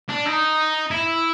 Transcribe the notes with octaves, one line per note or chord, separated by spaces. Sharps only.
D4
D#4
E4